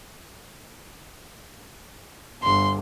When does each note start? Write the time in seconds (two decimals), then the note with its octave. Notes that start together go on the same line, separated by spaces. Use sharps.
2.43 G1 C6